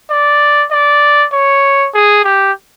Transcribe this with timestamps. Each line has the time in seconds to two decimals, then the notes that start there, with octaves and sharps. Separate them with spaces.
0.11 D5
0.72 D5
1.33 C#5
1.94 G#4
2.25 G4